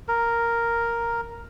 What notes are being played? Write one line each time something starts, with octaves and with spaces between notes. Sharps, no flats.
A#4